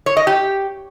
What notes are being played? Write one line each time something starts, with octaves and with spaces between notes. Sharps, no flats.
C#5
D#5
G4